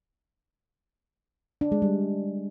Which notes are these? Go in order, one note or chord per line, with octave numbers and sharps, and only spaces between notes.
D4
G#3
G3